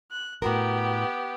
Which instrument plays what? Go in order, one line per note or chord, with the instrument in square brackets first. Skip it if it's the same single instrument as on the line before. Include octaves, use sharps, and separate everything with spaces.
[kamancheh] F#6
[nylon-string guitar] A2 F#4 A#4 [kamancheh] B3 G4